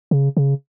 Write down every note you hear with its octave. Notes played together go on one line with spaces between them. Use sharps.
C#3
C#3